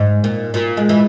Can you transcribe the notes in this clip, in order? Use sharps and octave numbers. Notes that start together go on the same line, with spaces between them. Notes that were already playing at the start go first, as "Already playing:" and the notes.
Already playing: G#2
A#2
A#2
G#3
E3